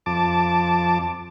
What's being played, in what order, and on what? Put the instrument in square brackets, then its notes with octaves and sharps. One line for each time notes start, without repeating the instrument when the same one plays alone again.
[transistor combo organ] F2 A5 D6